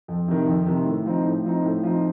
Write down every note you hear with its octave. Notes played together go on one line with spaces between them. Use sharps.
F2
C3 D#3
F2
C3 D#3
A2
F3 C4 D#4
A2
F3 C4 D#4
A2
F3 C4 D#4